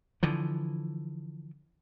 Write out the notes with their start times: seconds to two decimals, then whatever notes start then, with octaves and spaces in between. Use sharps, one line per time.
0.23 D3 E3 F3